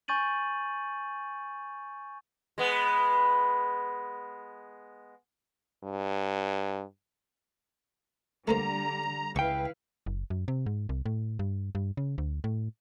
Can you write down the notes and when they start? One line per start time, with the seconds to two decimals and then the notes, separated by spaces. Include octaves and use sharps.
0.08 G#5 C#6 G6 A6 D#7 F#7
2.58 G#3 B3
5.84 G2
8.48 D3 G3 A3 A#3 C5 A#5
9.36 C#2 E4 B4 F5 G5 C#6
10.06 F#1
10.30 F#2
10.48 C3
10.66 G#2
10.89 C2
11.06 A2
11.39 G2
11.75 G2
11.97 C#3
12.18 D2
12.44 A2